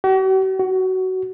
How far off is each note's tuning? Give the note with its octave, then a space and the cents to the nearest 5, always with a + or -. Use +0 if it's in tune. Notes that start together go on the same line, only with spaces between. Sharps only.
F#4 +45
F#4 +15